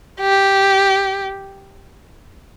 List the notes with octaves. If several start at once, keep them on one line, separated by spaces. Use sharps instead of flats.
G4